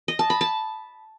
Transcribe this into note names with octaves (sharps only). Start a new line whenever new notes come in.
D#5
A5
B5
A5